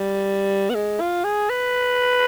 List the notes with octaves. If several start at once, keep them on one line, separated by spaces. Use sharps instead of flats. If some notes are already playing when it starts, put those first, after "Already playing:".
Already playing: G3
B3
G#3
F4
G#4
B4